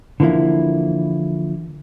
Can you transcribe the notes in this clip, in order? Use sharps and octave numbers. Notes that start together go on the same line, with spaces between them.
D3 E3 F3 A#3 E4